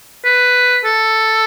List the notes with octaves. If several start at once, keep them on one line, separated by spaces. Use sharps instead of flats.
B4
A4